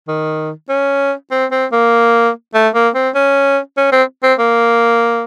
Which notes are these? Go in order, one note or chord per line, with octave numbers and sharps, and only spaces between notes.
D#3
C#4
C4
C4
A#3
A3
A#3
C4
C#4
C#4
C4
C4
A#3